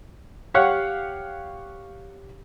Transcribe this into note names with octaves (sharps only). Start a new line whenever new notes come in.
G4 C#5 F5 F#5